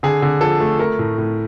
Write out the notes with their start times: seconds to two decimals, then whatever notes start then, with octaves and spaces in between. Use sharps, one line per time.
0.03 D3 G#4
0.22 D3
0.41 F3 A4
0.60 A3
0.79 A3 A#4
0.99 A2
1.18 A2